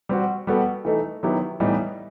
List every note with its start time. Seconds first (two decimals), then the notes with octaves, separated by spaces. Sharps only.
0.09 G3 C4 F#4
0.47 G3 B3 F#4 A4
0.85 E3 A3 D#4 A4
1.23 D#3 F#3 B3 E4 G4
1.60 A2 E3 G3 B3 D#4